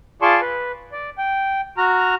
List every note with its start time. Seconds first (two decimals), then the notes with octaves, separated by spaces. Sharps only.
0.22 F4 G#4 D5 A5 C6 C#6
0.41 B4
0.92 D5
1.18 G5
1.77 F#4 A#5 F6